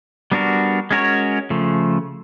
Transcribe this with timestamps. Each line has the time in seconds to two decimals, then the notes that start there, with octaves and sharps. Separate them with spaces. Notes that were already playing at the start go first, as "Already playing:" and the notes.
0.32 G3 B3 D4 F#4 A#4
0.91 G#3 C#4 F#4 A#4 C#5
1.50 C#3 F3 A3